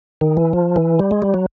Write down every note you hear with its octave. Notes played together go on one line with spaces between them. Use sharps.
D#3
E3
F3
E3
G3
G#3
G3
F#3